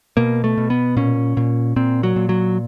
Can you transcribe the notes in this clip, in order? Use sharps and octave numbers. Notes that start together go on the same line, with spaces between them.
B2 A#3
A3
B2
B3
A#2 C#4
A#2
A#2 C4
F#3
A#2
F#3